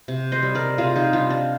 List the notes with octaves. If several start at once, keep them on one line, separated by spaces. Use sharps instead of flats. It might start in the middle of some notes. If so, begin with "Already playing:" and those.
C3
C5 D#5
G3
A#4 D5
C3 F4 G#4
D#4 G4
G3 D4 F4
D4